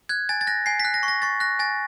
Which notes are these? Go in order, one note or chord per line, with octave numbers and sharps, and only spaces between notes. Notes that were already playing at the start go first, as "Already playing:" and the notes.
F#6 G#6
G#5 A6
A6
F#6 A#6
G#5 C7
B6
F#6
A#6
C#6
A#6
C#6 A6
F#6 A#6
G#5 A6